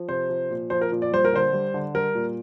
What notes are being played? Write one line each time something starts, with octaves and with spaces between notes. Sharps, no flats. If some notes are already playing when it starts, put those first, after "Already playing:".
Already playing: F3
C3 C5
F3
A#2
F3 C5
A#4
A#2
D5
G3 C5
A#4
D3 C5
G3
D3
G3 A#4
A#2